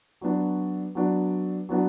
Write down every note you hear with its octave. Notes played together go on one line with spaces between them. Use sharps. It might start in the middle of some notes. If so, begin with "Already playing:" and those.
F#3 B3 D4 F#4
F#3 B3 D4 F#4
F#3 B3 D4 F#4